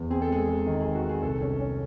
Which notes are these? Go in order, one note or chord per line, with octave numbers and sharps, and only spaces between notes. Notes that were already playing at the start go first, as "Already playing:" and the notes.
Already playing: E2
C4 G#4
A4
G#3 G#4
G#3
D#3
G#4
D#3
F#4
D#3
G#4
C2 A4
C#4
C#4